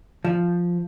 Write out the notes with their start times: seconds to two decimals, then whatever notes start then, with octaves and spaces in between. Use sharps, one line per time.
0.25 F3